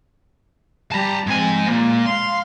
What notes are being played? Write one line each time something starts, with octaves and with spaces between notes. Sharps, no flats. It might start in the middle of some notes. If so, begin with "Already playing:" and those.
G3 G4 A5 A#5
G#2 F3 C4 G#5
A#2 G#3 A#3
F5 C6